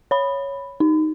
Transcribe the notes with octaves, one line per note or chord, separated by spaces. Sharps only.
C#5 B5
D#4